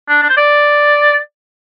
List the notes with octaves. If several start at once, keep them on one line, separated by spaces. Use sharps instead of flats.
D4
D4
C5
D5